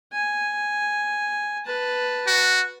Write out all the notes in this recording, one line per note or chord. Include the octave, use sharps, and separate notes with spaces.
G#5
B4 A5
F#4